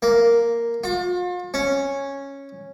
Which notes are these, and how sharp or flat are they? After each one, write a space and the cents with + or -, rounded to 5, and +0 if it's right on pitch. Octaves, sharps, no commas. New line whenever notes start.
A#3 +0
F4 +40
C#4 -5